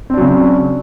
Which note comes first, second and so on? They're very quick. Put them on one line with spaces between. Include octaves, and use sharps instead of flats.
C4 D4 F#3 C#3